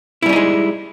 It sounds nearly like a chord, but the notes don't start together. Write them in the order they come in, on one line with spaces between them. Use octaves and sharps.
E4 G3 C#4 D#4 G#3